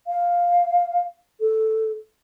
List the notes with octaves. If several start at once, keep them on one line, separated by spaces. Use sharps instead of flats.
F5
A4